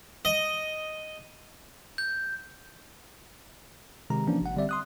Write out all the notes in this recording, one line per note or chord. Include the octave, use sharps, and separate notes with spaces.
D#5
G6
C3 D#3 G#3 A#5
E3 F3 A#3 C#4 D4
G#1 F#5
D3 G3 C4 D5 E5
C6 D#6 F#6